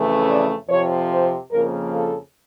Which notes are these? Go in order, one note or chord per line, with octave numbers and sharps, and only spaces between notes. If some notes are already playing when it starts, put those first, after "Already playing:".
Already playing: F2 C#3 E3 A3 C#4
D5
F2 C3 F3 C#5
C5
F2 C#3 F3 A#3 A#4
A4